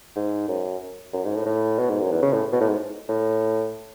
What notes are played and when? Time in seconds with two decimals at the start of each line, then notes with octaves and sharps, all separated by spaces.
0.16 G#2
0.48 F#2
1.13 F#2
1.24 G#2
1.35 A2
1.46 A2
1.79 B2
1.90 G#2
2.01 F#2
2.11 E2
2.22 C#3
2.33 A2
2.52 B2
2.60 A2
2.68 G#2
3.09 A2